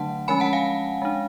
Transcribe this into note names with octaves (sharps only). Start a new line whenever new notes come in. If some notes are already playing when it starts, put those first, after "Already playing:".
Already playing: D3 F#3 A3 D4 F#5 A5
F3 G#3 C#4 G#5 B5
F#5 A5
F5 G#5
G#3 D4